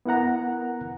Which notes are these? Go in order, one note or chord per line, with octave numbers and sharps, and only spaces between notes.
B3 E4 A#4 F#5 A#5